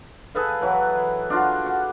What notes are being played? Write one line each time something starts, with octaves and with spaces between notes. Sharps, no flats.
G#4 A4 B4 F5
E3 F#3 B4
D4 F4 F#4
F#4